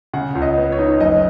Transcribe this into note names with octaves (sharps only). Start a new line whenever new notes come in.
C#3 F#5
C#2
D#5
B3
C#5
D#4
F#1 D#5